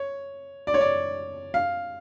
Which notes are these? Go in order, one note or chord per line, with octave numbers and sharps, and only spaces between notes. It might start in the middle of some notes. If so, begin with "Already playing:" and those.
Already playing: C#5
D5
C#5
D5
F5